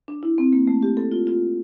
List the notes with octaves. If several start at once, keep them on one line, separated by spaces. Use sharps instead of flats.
D4
E4
C4
A#3
A3
G4
A4
F4
F4